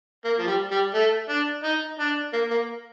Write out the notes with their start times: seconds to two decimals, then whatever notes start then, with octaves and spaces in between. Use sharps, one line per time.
0.24 A#3
0.39 F3
0.47 G3
0.71 G3
0.94 A3
1.29 D4
1.64 D#4
1.99 D4
2.33 A#3
2.51 A#3